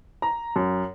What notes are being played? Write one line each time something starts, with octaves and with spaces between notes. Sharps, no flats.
A#5
F#2